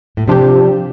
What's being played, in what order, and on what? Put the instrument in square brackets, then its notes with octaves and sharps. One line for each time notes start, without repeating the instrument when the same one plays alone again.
[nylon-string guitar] A2
[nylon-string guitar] C3 [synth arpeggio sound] F3 D4 G4